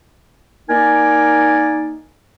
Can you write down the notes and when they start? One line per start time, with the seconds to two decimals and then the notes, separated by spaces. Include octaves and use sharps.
0.70 A#3 D#4 A#4 D5 G#5